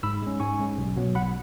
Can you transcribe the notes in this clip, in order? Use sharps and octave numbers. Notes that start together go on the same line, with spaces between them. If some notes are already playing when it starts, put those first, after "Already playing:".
G#2 B5 E6
G#3 C#4
G#2 G#5 C#6
G#3 C#4
B1
B2 F#3 B3
B1 F#5 B5